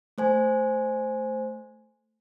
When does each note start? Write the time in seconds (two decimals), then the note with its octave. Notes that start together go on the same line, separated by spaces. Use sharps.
0.18 A3 C5 G#5